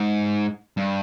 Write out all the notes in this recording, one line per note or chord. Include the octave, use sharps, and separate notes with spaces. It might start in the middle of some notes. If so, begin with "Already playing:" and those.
Already playing: G#2
G2